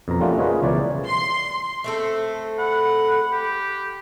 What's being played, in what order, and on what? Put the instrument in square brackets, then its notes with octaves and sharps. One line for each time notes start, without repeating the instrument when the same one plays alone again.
[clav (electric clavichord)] F2 B2 A#5
G3 A3 A#3 C#4 F4 F#4
F4 G#4 A#4 B4 C#5 D#5
C#2 B2 E3 C#5 D5
[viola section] C6
[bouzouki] A3 C4 A4
[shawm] F#5 [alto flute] B5
[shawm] G4